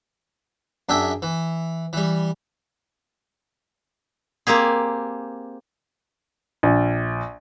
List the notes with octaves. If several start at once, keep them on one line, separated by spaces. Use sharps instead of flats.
F#2 D4 G#4 E5 G5 D6
E3
E3 G3
A#3 C4 G4 G#4
A#1